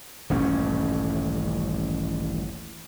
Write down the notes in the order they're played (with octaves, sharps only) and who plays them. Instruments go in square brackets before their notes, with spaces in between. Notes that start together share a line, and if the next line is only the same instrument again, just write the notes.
[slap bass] D#1 A1 G2 C#4